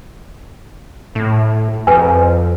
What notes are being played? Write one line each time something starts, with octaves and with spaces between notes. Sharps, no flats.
A2
F2 B4 G#5